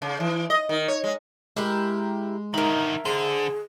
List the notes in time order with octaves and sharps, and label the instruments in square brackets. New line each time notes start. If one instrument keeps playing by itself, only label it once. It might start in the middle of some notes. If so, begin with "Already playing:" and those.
[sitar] C#3
E3
D#5
D#3
C#5
G#3
[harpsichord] G#3 [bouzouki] E4 G4 A#4
[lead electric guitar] D3 D#3 [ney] D#4 [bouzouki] A#4 E5
[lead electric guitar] D3 [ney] G#4 [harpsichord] C5